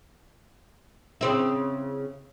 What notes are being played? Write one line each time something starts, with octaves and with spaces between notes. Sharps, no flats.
C#3 C4 E4